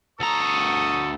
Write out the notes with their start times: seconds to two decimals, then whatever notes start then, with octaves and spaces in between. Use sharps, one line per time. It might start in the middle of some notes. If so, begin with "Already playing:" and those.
0.20 D2 A4 A#5 C#6 D#6